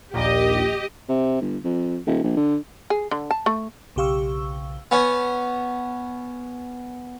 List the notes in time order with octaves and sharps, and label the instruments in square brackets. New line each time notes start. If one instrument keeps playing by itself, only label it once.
[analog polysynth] A#1 D#2 A#2 [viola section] G4 D#5
[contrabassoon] C3
G1
F2
D#1
A#1
D3
[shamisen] G#4
D3
A5
A3
[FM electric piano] B1 C#3 G4 F5 C#6 E6
[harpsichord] B3 C#4